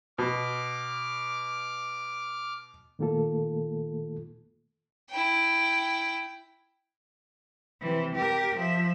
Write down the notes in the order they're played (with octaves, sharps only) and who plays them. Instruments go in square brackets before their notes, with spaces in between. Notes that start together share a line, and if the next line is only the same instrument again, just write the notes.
[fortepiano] B2 [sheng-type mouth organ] D6 F6
[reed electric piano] A#2 D#3 A3 A#3 F4 A4
[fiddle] E4 G5
[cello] C3 E3
G4 A#4
F3 E5